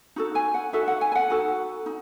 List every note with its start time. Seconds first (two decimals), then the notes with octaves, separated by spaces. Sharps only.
0.16 D#4 F#4 A4
0.35 G#5
0.54 F#5
0.73 D#4 F#4 A4 E5
0.88 F#5
1.01 G#5
1.12 G#5
1.15 F#5
1.30 D#4 F#4 A4
1.86 D#4